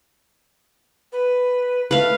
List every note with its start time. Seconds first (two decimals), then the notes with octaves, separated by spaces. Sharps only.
1.12 B4
1.91 A3 B4 F5